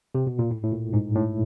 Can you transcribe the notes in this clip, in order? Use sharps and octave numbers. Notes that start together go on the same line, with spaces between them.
C3
B2
A#2
A2
A2
A#2
G#2
A2